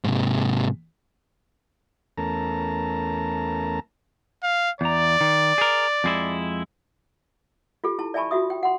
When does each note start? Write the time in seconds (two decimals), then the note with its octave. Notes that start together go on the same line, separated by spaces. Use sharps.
0.04 G#2 C3
2.18 E2 A3 C#4 A#4 A5 A#5
4.43 F5
4.81 E2 D5 A#5
5.21 D#3
5.58 G#4 A#4
6.04 F2 G#3 E4
7.84 F4 G4 A4
7.99 E4 A5
8.14 D5 E5 G#5 A5 B5 C#6
8.31 F4 F#4 E5 D#6
8.50 G5
8.63 F#5 C6